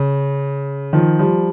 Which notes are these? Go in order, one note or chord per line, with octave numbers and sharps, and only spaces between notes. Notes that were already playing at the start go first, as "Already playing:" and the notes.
Already playing: C#3
D#3 F3
F3 G3